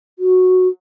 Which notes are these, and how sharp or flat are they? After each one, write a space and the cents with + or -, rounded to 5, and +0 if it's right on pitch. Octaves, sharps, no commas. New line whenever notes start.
F#4 -5